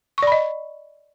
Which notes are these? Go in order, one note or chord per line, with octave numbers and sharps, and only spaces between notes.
D5 D#5 B5 C#6